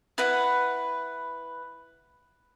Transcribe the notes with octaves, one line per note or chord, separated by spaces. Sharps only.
E4 B4 F#5